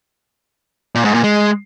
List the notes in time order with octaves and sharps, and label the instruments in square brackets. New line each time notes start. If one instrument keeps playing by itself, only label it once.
[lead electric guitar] A#2
G#2
A#2
G#3